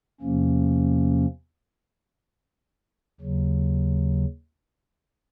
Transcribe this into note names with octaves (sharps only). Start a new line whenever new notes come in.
E2 C3 F3 A#3 C#4
D#2 C#3 F#3